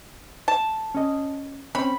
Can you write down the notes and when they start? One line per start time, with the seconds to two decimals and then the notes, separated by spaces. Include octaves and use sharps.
0.48 A5
0.95 C#4 D#5
1.75 C4 C#4 B5